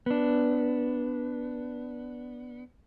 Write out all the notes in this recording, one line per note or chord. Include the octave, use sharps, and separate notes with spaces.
B3 D4